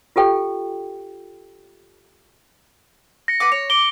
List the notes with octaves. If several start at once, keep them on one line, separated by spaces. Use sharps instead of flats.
F4 G4 A4 G5
A#6 C#7
B4 F#5 D6
C#5
D6 D7 G7